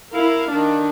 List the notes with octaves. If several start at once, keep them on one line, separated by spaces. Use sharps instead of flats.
E4 A#4 F5
D#3 D4